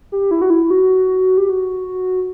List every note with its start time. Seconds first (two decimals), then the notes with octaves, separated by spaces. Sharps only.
0.12 G4
0.31 E4
0.42 F#4
0.50 E4
0.70 F#4
1.38 G4
1.49 F#4